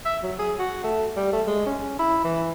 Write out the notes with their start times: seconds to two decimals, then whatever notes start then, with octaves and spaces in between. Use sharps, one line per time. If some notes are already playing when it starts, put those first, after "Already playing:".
0.06 E5
0.23 F#3
0.39 G#4
0.59 F#4
0.84 A3
1.17 G3
1.33 A3
1.47 G#3
1.66 C#4
1.99 E4
2.24 E3